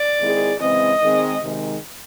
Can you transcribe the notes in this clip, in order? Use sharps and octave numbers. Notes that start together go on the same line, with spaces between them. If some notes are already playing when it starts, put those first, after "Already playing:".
Already playing: D5
D#3 G#3 C4 E4 G#4
C#3 E3 G#3 C4 D#5
D#3 G#3 C4
C3 D#3 G#3